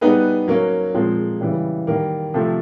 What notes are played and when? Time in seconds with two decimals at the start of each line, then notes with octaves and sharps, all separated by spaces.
0.01 G3 B3 D#4 G#4 B4
0.48 F#3 A#3 C#4
0.94 A#2 F3 G#3 C4
1.41 C#3 E3 G3
1.87 D#3 G3 A#3
2.34 C3 F3 A3 C4